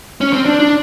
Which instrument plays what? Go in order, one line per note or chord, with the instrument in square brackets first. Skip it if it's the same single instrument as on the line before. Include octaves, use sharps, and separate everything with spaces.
[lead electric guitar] C#4
C4
D4
D4